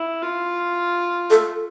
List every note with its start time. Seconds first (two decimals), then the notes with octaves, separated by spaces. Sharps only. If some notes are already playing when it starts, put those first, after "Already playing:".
Already playing: E4
0.22 F4
1.30 A4